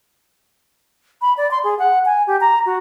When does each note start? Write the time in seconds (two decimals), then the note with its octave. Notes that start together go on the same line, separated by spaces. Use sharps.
1.22 B5
1.37 D5
1.51 C6
1.64 G#4
1.79 F#5
2.06 G#5
2.27 G4
2.41 A#5
2.66 F#4